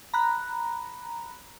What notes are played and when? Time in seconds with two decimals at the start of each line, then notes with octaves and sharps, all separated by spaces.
0.14 A#5 B5 F#6